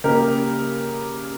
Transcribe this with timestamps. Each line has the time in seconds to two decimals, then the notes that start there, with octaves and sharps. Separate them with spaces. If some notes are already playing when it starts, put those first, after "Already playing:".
0.04 C#3 G3 A#3 G4 A#4